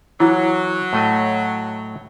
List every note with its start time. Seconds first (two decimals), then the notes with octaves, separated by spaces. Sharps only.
0.20 E3 F#3 E4
0.93 A2 A3 D#5